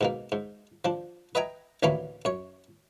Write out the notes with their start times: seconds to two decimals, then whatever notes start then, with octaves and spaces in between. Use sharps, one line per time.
0.01 G#2 B2 A#3
0.32 G#2
0.85 F3 D4
1.35 B4 D#5 E5 G5 G#5 A#5
1.83 A1 D2 E3 A#3 C#4 B5
2.25 F#2 C#5